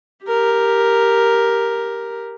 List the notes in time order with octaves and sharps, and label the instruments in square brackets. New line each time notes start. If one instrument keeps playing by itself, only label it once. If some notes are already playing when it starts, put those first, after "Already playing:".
[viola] G4 A#4